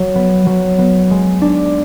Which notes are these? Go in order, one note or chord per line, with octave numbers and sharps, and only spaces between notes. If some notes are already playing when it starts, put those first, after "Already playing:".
Already playing: F#3
B3
F#3
B3
G#3
D4